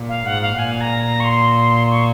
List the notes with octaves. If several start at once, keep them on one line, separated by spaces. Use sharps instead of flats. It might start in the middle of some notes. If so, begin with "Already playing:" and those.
Already playing: A#2
F5
G#2 F#5
F5
A#2 G#5
A#5
A#5
C#6
C6
C#6